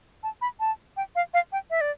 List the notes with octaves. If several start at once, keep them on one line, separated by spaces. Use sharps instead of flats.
A5
B5
A5
G5
F5
F5
G5
E5
D5